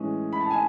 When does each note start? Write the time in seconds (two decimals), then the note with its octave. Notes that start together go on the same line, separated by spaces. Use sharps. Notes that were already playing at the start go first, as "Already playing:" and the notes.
Already playing: A2 E3 G#3 C#4
0.33 B5
0.41 A5
0.51 G#5